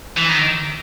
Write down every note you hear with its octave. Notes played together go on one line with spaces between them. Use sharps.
E3
D#3